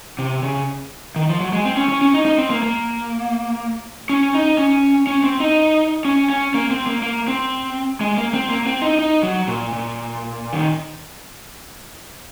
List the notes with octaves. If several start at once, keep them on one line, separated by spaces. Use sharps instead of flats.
C3
C#3
D#3
F3
F#3
G#3
C4
C#4
C#4
C#4
D#4
D#4
C4
A#3
A#3
C#4
D#4
C#4
C#4
C4
D#4
C#4
C#4
A#3
C4
A#3
A#3
C4
G#3
A#3
C4
A#3
C4
D#4
D#4
F#3
A#2
A#2
D#3